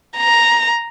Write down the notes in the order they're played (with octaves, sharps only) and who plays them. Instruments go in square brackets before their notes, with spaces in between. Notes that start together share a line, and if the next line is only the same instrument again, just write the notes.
[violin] A#5